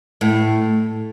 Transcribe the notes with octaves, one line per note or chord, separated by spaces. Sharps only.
A2